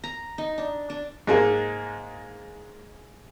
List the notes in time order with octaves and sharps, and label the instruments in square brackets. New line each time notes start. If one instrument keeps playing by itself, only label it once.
[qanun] A#5
D#4
D4
D4
[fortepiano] G#2 G#3 A#3